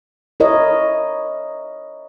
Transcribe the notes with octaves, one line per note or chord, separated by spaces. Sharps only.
E4 A#4 C#5 D#5